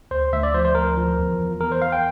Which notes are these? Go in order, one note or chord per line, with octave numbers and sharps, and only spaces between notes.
D2 C5
D2 E5
D5
F3 C5
C5
D2 A#4
F3
E2
E2
E2 A#4
C5
E2 F5
G5